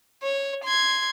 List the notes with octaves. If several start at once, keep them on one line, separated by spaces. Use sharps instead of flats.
C#5
C6 G#6